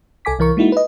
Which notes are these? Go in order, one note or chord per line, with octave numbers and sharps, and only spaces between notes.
C2 A4 G#5 D6 B6
C2 E3 A#4 C#6
G#3 A#3 D#4 E4 F#4
B4 D#5